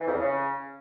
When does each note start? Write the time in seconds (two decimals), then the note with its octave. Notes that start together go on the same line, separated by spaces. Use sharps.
0.01 E3
0.07 F2
0.14 E2
0.20 C#3